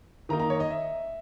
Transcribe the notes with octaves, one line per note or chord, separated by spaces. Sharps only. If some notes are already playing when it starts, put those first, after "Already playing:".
D#3 A#3 D#4 A#5
A#5
C#5
D#5
E5